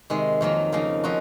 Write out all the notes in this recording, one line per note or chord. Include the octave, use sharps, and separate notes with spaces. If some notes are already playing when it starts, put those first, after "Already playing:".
C3 D#3 G#3
F2 D#3 F#3 A#3
C#3 F3 A#3 D#4
F3 C4 D#4 F#4